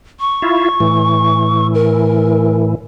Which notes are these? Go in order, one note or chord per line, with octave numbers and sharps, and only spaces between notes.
C#6
E4 F4
A2 E3
A#4